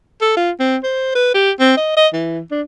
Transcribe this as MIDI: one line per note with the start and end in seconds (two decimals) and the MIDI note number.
0.21 0.36 69
0.37 0.51 65
0.60 0.77 60
0.83 1.12 72
1.15 1.32 71
1.34 1.51 67
1.60 1.74 60
1.77 1.96 75
1.97 2.07 75
2.13 2.40 52
2.51 2.62 62